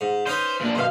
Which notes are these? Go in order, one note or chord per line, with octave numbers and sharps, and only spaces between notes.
G#2
C#4 D#4 B4 C5
A#2 D4
F#2 B2 C5 F5